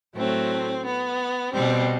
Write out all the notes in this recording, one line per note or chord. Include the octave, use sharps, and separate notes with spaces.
A2 F#3 A3 C4
B3
B2 G3 C4